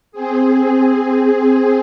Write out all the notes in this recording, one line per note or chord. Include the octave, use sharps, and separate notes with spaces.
C4 G#4